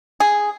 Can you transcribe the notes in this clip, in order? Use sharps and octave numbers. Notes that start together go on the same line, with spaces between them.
G#4